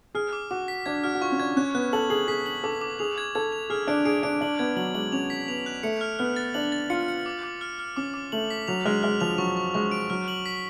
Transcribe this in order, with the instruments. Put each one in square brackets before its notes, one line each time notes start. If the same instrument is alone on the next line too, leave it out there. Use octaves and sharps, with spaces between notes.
[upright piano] G#4 [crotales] F6
[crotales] D6
[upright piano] F#4 [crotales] D6
[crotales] B6
[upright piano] D4 [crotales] G#6
[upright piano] F#4 [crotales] F6
[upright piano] F#4
[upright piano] F4 [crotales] C#6
[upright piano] C#4
[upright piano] D4 [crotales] G#6
[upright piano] C#4 [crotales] F#6
[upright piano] B3 [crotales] F#6
[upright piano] A4 [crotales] F#7
[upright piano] G#4 [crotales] F#7
[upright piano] G#4 [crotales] B6
[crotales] F#7
[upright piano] A4 [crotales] D6
[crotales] D6
[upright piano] G#4 [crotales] F7
[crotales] G#6
[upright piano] A4 [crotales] G#6
[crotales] F7
[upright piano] G#4 [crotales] F6
[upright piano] D4 [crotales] D7
[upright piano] G#4 [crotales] D7
[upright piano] D4 [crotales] D7
[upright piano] D4 [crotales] F#7
[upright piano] B3 [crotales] G#6
[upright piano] F#3 [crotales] F#7
[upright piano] G#3 [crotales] F#7
[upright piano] C#4 [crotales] F7
[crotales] B6
[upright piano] B3 [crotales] F7
[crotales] F#6
[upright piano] A3 [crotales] C#7
[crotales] F6
[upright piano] B3 [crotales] F6
[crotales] A6
[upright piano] D4 [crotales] F#7
[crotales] A6
[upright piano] F4 [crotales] C#7
[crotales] C#7
D6
D6
F6
F6
[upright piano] C#4 [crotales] D6
[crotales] D6
[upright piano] A3 [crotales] F#7
[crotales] B6
[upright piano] F#3 [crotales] F7
[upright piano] G#3 [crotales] F6
[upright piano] G#3 [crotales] F6
[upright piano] F3 [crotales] F7
[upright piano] F#3 [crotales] C#6
[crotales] C#6
[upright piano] G#3 [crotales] C#6
[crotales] D7
[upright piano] F#3 [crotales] F6
[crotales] F#7
B6